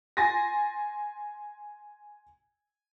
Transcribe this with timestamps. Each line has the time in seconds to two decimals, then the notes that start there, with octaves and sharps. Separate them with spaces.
0.17 G#5 C6 A6 A#6